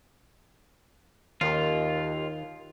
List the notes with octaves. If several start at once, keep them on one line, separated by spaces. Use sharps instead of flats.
D#2 D#3 F4